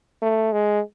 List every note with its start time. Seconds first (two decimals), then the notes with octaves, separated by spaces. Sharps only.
0.22 A3
0.52 G#3